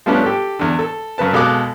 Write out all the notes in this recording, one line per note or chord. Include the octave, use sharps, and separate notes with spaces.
F3 G3 A3 B3 C#4 D4
G4 A4
E2 D3
A4
F#2 C#3 B4 A5
B2 G#3 A4 F5 D6 F#6